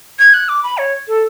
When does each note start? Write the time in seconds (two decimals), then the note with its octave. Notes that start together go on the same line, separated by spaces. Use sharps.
0.19 G#6
0.34 F#6
0.49 D6
0.63 B5
0.78 C#5
1.08 A4